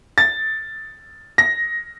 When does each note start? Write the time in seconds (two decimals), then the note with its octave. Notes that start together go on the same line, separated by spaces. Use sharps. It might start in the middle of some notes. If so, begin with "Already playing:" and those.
0.18 A6
1.38 A#6